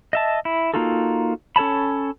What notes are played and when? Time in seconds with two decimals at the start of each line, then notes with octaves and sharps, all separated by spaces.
0.13 D#5 E5 A5
0.45 E4
0.74 A#3 D#4 F4 F#4 A4
1.56 C#4 A4 C#5 A5 B5